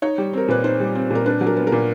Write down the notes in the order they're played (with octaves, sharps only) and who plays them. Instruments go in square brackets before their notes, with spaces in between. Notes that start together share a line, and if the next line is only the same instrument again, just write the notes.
[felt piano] D#4 C#5
G3
C4 A#4
A#2 B4
D#4 C5
G3
C4
A#2 A#4
D4 B4
F#3
A#4
B3
A#4
A#2